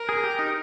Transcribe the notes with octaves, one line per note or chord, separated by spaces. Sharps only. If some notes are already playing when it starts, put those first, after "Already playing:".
Already playing: A#4
G#4
G4
D#4